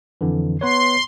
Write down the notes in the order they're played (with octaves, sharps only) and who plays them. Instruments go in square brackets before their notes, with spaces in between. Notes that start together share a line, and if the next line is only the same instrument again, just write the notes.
[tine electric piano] F2 D3 E3
[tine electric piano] B3 B4 C#5 [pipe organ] C6